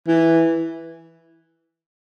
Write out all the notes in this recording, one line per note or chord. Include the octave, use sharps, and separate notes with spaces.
E3